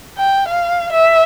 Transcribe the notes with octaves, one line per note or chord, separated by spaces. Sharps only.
G5
F5
E5